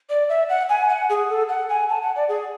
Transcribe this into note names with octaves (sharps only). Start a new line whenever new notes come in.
D5
E5
F#5
G#5
F#5
G#4
A4
F#5
G#5
A5
F#5
D5
G#4